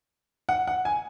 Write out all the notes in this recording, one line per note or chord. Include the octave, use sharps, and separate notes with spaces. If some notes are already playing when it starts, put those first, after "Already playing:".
F#5
F#5
G#5